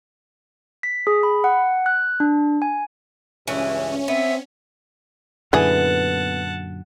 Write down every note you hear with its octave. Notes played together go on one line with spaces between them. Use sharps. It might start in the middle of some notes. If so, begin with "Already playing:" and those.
B6
G#4
B5
F#5
F#6
D4
G#5
C#2 G2 E3 C#4
B3 C4 E5
F#2 A#2 D3 E3 B3 G#4 F#5 A5